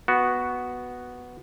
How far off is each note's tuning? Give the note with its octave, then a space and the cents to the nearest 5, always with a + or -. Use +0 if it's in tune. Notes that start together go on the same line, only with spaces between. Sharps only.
B3 +0 F#4 +0